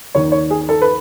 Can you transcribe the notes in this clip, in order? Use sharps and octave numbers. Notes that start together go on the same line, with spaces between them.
D#2 D#3 C#5
C#5
G#4
A4
B4